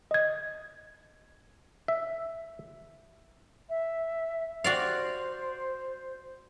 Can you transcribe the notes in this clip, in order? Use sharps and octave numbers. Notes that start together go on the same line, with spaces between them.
D#5 G#6
E5
E5
F#4 C5 D5 F5